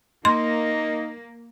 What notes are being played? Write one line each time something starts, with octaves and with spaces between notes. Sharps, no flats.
A#3 D#4 C6